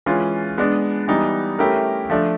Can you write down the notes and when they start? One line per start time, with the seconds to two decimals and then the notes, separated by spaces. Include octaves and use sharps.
0.06 E3 G#3 C#4 F4
0.58 G#3 B3 D4
1.08 E3 G3 B3 D#4
1.59 A3 C#4 E4 G4 A#4
2.10 F3 A3 D4